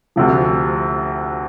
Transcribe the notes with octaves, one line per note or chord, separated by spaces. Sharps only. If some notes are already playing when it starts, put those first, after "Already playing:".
D2 C3 F3